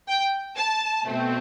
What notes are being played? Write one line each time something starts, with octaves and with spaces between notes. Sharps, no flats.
G5
A5
B2 A3 C4